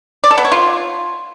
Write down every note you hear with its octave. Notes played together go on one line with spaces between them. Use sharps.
D5
A4
B3
C#5
F4